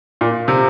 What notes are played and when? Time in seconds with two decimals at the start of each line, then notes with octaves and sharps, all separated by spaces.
0.21 A#2
0.48 C3